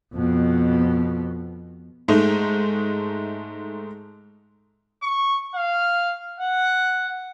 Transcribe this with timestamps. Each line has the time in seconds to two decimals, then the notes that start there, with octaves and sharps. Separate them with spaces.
0.14 F2 B2
2.08 G#2 G#3 A3 D#4
5.02 C#6
5.55 F5
6.40 F#5